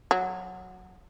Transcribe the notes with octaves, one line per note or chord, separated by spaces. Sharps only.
F#3